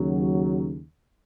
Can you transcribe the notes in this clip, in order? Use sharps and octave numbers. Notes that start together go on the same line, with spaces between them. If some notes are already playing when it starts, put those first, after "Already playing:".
Already playing: D#2 C#3 F#3